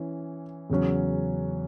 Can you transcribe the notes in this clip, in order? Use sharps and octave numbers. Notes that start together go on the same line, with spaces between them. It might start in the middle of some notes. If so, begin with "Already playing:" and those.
Already playing: E3 C#4
E2 C#3 F#3 C#4